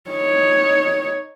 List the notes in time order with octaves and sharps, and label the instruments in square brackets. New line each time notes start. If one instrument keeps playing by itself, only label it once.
[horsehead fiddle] D#4 C#5